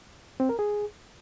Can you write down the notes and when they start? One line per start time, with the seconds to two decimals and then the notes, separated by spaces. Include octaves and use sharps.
0.40 C4
0.49 A#4
0.59 G#4